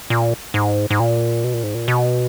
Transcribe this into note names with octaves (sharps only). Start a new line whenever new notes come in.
A#2
G#2
G#2
A#2
B2
A#2
G#2
A#2
B2